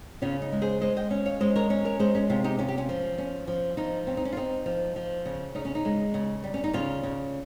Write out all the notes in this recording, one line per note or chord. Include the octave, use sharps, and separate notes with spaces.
C#3 C#4 F4
D#4
G#3
G#4 C5
G#3 C5 D#5
D#5 G5
C#4
C#5 F5
G#3 C5 D#5
A#4 C#5
C#4
A#4 C#5
G#3 G#4 C5
C#4
C3 C#4 F4
D#4 G4
C#4 F4
G4
C#4 F4
F3
C#4
F3
F3 D#4
C4 C#4
D#4
C#4
F4
C4 D#4
F3
F3
C#3
C#3 D#4
C#4
D#4
G#3
C#3
G3
C#4
D#4
C#3 C#4 F4
C#3